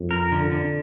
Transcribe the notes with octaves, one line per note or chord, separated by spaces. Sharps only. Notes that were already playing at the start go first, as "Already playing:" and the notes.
Already playing: F2
A#4
D3
D3